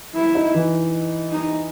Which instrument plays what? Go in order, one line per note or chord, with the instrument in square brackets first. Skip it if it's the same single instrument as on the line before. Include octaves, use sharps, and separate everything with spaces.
[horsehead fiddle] E4
[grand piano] D#4
E3
[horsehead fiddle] D#4